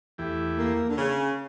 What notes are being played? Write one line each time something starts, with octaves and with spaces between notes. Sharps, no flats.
E2 E3 A3 E4 G4
A#3
D3
C#3